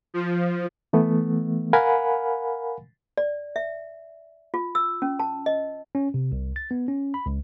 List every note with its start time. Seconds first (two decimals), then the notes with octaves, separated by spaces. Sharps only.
0.14 F3
0.93 E3 A3 B3
1.73 A#4 F5 F#5 G#5 B5
3.18 D5
3.56 E5
4.54 F4
4.75 E6
5.02 C#4
5.19 A5
5.46 D#5
5.95 C#4
6.14 C3
6.32 C2
6.56 A6
6.71 B3
6.88 C#4
7.14 B5
7.26 C#2